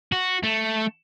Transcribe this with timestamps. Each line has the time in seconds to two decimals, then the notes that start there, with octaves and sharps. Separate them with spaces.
0.12 F#4
0.43 A3